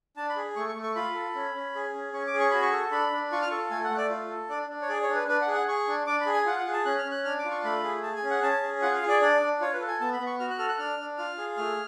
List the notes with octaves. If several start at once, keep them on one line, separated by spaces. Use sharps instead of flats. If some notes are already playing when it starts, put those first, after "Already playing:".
D4 A5
B5
G#4
A3 C#6
C#6
A3
C#6
F4 B5
A4
C#4
C#4
G#4
C#4
C#4 C#6
D6
G#4
C#6
F#4 B5
C#6
A4
D4 B5
D4
F4 C#6
F6
A4 C#6
A3 G#5
F#5
A3
D5
F4
A4
D4 D5
D4
C#5
G#4 D5
C#5
D4
B4
D4 B4
F#5
G#4
F#5
G#4 C#6
D4
D4 D6
B5
G#4
G#5
F4 F#5
F#5
G#4
A5
C#4 F#6
F6
C#4
F#6
D4 F6
D6
F4
C#6
A3 B5
G#4
G#4 A5
G#5
C#4
F#5
C#4 A5
G#4
F4 F#5
F5
G#4
D5
D4 D5
D4
F4 C#5
B4
A4
G#5
B3 A5
B5
B3
C#6
F#4 F6
F#6
A4 F6
F#6
D4 F6
D4
F4 F6
G#4
A3 F6